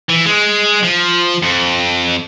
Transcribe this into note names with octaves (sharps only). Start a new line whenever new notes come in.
E3
G#3
F3
F2